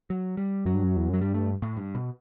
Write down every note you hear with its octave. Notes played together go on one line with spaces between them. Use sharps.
F#3
G3
F#2 F#3
G2
F#2
E2
F#2 F#3
G2 G3
A3
A2
G2
B2